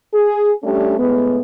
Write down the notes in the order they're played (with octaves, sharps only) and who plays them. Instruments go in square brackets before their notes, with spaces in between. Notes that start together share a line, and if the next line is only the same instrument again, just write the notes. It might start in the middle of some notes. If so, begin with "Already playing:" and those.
[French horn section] G#4
G3 A3 C#4 D4 G4
A2 G#3 B3